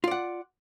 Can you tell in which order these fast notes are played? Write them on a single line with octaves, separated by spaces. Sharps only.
F4 D5 F#5